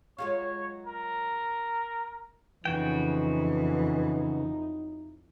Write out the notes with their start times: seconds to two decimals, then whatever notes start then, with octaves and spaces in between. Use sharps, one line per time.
0.18 F#3 G#3 F4 C#5
0.87 A#4
2.65 F2 C#3 E3 F#3 D#4 E4 F#4 G5